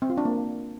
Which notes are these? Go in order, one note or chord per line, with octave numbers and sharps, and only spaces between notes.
C4
F4
D4
A#3